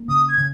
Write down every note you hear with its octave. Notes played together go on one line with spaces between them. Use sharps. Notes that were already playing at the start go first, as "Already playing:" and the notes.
Already playing: A#3
C#3 D#6
G#6
C#3